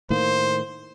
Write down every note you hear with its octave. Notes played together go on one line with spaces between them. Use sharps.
A2 D#3 A#3 C5